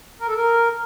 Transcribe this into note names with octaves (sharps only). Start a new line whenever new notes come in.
A#4
A4
A#4